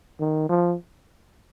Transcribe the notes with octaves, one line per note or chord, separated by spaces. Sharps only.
D#3
F3